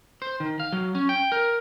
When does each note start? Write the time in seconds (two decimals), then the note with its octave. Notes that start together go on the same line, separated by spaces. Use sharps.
0.22 C5
0.40 D#3
0.60 F5
0.72 F#3
0.95 C#4
1.09 G5
1.32 A#4